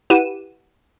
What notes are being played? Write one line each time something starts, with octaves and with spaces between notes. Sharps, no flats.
E4 G4 B4 F#5 D#7 E7